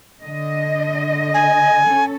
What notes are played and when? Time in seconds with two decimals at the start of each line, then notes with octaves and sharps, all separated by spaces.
0.22 D3 D#5
1.34 G#5
1.85 C#4 A4